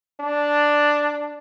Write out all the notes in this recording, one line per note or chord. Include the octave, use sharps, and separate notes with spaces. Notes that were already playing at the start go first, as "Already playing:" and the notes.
D4